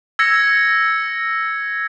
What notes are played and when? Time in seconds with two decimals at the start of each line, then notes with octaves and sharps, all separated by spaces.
0.19 E6 G#6 A#6 C#7